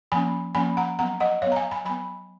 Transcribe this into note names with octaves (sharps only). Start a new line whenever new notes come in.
F3 A#3 C#4 G#5 B5
F3 A#3 C#4 G#5 B5
F#5 A#5
F#3 B3 F#5 A#5
D#5 F#5
F#3 B3 C#5 F5
A#5
F5 G#5
G#5 B5
F#3 B3 G#5 B5